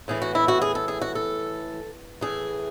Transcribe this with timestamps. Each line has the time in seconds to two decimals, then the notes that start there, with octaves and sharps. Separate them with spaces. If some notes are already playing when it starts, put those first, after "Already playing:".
0.08 A2 E3 G#4
0.22 F#4
0.35 E4
0.48 F#4
0.62 G#4
0.75 A4
0.88 G#4
1.01 F#4
1.15 A4
2.21 A2 E3 G#4